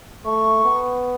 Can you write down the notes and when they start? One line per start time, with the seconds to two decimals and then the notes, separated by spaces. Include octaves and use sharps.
0.25 A3 C#6
0.64 B3